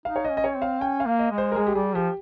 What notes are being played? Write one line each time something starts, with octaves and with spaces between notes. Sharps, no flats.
D#4 F5
C#5
D#5
C#4
D#5
C#5
C4
F5
C#4 G5
F5
A#3
D#5
G#3
C5
A#4
G#3 G#4
G4
G3 G#4
F3 G4